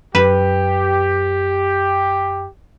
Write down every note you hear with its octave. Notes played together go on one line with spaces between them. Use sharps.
F#2 G4 B4